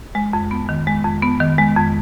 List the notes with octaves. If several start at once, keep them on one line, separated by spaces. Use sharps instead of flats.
G#3
F2
B3
D#3
G#3
F2
B3
D#3
G#3
F2